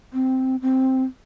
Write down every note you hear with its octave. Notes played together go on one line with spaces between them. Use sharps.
C4
C4